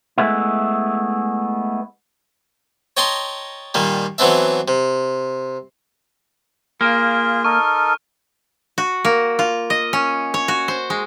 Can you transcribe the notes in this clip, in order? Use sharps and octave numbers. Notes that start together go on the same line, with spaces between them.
G#3 A3 B3 E4
C#5 D#5 G5 A5 A#5 C6
A#2 D#3 G3 A#3
E3 F#3 B3 C4 D4 E5
C3
A#3 F4 G#4 F6
D#4 A4 A#4 C#6
F#4
A#3
F4
D#5
C#4
C#5
F#4
C5
G#3